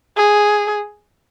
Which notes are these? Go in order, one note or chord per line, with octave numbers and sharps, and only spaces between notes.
G#4